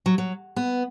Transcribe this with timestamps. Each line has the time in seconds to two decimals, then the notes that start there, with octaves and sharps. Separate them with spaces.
0.06 F#3
0.18 F#3
0.56 B3